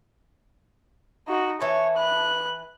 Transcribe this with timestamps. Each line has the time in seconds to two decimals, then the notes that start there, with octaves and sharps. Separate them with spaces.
1.28 D#4 F#4
1.61 E3 C#5 A5
1.97 B4 F#6